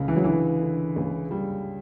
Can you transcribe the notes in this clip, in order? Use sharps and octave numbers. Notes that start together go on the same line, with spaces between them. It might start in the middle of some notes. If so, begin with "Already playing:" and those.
Already playing: C#2 C#3
E3
F#3
D3 E3
D3
C#2
G3